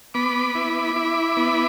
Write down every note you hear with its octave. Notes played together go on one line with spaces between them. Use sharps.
B3 B5 D6
E4
E4
B3